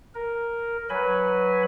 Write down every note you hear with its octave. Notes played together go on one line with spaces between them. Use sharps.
A#4
F#3 B4 G#5 B5